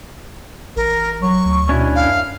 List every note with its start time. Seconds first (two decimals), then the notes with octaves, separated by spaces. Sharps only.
0.76 A1 A#4
1.22 F#3 C#6
1.45 D2
1.69 B2 C#4 D4 E4
1.95 F#2 F5